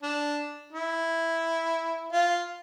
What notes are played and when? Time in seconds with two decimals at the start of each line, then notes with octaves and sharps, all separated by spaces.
0.02 D4
0.73 E4
2.13 F4